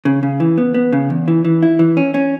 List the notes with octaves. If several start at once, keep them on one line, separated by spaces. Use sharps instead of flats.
C#3
C#3
E3
B3
B3
C#3
E2
E3
E3
E4
E3
C#4
C#4